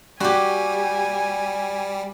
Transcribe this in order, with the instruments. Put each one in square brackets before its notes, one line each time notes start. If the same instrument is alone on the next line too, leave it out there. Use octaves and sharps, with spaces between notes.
[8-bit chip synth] G3 [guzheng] F#4 G4 [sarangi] G#5